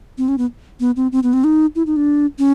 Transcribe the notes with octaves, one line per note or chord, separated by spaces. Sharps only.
C4
C#4
B3
B3
C4
C4
B3
C4
D#4
E4
D#4
D4
C#4